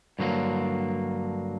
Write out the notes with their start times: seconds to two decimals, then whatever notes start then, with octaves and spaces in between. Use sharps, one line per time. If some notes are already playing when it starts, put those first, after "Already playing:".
0.19 G2 D3 F#3 A#3